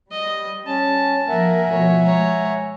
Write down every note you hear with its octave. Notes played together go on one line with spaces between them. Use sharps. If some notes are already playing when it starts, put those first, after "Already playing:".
G3 D#5
C#4 A5
F3 A#3 A#4 E5 F#5 G#5
B2 F3 A3 C#5
G#3 C#5 A#5